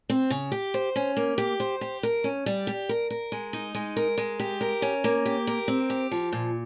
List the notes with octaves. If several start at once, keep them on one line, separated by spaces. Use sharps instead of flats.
C4
C#3
G4
C5
C#4
A#3
G4
C5
G4
A#4
C#4
G3
G4
A#4
A#4
G#3
D#4
G#3
A#4
G#3
G4
A#4
C#4
A#3
G4
A#4
C4
G4
F3
A#2